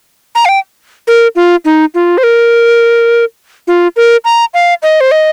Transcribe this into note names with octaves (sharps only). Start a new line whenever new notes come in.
A#5
F5
G5
A#4
F4
D#4
F4
C5
A#4
F4
A#4
A#5
F5
D#5
C5
D#5